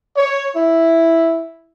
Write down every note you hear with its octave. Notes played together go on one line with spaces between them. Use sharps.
C#5
E4